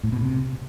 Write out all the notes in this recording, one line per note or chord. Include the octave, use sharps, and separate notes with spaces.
A2
B2
C3